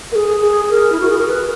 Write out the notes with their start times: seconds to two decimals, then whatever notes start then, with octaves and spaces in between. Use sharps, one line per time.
0.12 A#4
0.16 G#4
0.41 G#4
0.70 A#4
0.92 E4
1.00 F#4
1.10 G#4
1.18 A#4
1.28 B4